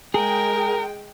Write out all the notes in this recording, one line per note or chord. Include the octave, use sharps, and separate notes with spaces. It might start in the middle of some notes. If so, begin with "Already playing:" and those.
G#3 G#4 A#4 G5